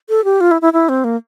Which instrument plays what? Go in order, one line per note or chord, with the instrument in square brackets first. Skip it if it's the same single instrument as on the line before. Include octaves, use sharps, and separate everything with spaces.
[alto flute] A4
G4
F4
E4
E4
E4
C4
A#3